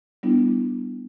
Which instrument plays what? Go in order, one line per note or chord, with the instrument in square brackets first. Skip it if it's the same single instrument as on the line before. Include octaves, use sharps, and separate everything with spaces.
[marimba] G3 B3 D4 E4